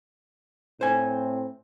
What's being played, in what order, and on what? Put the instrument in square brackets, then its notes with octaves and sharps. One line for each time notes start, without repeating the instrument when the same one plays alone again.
[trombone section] A2 C4 [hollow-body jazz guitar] C5 G#5